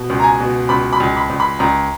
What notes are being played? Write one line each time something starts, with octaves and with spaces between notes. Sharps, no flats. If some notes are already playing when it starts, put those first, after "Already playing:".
Already playing: B2
C#2
A#5
G#5
B2
C#2 B5
B5
C#2
B5
C#2
B5
C#2 A#5